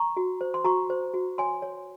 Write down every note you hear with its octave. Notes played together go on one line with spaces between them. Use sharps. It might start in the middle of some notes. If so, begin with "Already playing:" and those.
Already playing: A#5 C#6
F#4
C5
C6
F#4 A#5 C#6
C5
F#4
C#5 G#5 C6
C#5